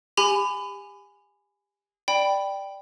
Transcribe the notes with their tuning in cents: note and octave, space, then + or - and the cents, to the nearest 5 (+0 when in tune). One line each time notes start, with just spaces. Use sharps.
G4 +25 G#5 +0 B5 +25
D5 +5 G5 +0 B5 +0